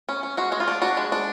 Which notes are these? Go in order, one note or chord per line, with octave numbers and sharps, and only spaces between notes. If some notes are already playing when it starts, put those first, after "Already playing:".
C#4
C#4
G#3 F#4
G#3 F#4
F4
D4
D4 F#4
G#3
D4